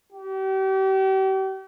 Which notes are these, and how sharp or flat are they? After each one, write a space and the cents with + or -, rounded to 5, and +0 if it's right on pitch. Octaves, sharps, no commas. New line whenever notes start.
G4 -40